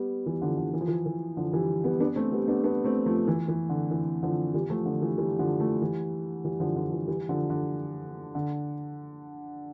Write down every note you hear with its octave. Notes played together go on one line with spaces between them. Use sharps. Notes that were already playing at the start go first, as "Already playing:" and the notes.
Already playing: G3 B3
E3 G3
D3 F3
D3
E3
F3
E3
E3
D3 F3
E3 G3
G3 B3
B3 D4
A3 C4
G3 B3
B3 D4
B3 D4
A3 C4
F3 A3
E3
E3
D3
E3
D3 F3
E3 G3
F3 A3
D3 F3
E3 G3
E3 G3
D3 F3
F3 A3
E3 G3
E3 G3
D3 F3
D3 F3
E3
E3 G3
D3 F3
D3
D3